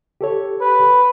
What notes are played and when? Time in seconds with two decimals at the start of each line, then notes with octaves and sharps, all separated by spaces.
0.21 G4 A4 C#5
0.62 B4